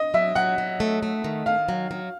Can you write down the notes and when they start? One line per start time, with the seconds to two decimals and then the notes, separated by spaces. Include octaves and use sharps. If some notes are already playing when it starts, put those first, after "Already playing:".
Already playing: D#5
0.14 F#3 E5
0.35 F#3 F#5
0.58 F#3
0.80 A3
1.03 A3
1.24 D#3
1.46 D#3 F5
1.69 F#3
1.91 F#3